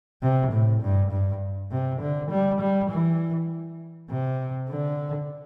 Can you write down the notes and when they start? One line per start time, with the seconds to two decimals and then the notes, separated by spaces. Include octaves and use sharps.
0.22 C3
0.52 A2
0.82 G2
1.11 G2
1.71 C3
2.01 D3
2.31 G3
2.61 G3
2.90 E3
4.10 C3
4.70 D3